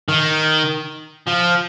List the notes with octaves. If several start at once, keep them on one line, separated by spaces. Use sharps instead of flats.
D#3
F3